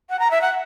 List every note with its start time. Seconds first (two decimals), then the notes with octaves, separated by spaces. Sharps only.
0.10 F#5
0.19 A#5
0.31 E5
0.41 F#5